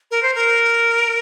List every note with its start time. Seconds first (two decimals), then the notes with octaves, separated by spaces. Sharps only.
0.11 A#4
0.23 C5
0.35 A#4